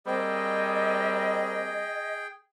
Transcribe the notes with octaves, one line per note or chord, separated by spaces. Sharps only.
G3 A#3 C4 G#4 D#5 G5